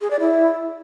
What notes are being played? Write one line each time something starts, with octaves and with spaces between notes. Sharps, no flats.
G#4
D5
E4